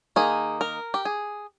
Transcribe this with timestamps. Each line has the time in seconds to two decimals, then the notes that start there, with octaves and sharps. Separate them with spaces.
0.16 D#3 A#3 D#4 G#4
0.61 A#4
0.94 G4
1.05 G#4